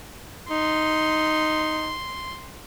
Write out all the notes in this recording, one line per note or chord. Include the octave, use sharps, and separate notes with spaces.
D#4 C6